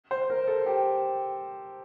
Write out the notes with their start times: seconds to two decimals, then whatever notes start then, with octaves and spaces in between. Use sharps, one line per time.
0.11 C5
0.30 A#4
0.47 A4
0.66 G4